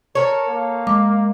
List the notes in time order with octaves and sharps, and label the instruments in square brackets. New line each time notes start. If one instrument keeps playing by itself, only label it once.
[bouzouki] A4 C#5 [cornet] A#4
[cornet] A#3
[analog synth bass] G#3 [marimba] D6